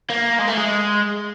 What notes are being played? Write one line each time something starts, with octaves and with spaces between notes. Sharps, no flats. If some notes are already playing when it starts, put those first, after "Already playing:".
A#3
G#3
A3
G#3